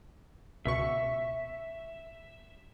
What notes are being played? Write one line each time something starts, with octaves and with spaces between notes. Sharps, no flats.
C#2 B2 E5 C#6